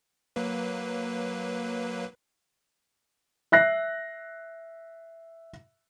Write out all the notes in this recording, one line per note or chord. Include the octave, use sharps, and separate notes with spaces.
F#3 A#3 B4
E5 F#6 A#6 C7